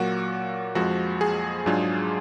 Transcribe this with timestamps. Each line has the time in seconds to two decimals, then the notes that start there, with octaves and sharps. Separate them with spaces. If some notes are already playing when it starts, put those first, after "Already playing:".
Already playing: A#2 F#3 A#3 F#4
0.75 F2 F3 G#3 F#4
1.21 G#4
1.66 G#2 F#3 D4 F4